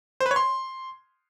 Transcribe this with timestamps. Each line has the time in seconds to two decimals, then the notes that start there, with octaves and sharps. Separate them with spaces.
0.20 C5
0.26 B4
0.31 C#5
0.36 C6